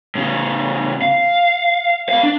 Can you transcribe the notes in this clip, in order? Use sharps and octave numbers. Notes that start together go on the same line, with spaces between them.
A2 C#3
F5
B3 F5
D4